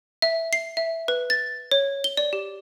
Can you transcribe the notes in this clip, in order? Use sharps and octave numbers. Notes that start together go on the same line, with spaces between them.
E5
C7
E5
B4
A6
C#5
G7
D5
G4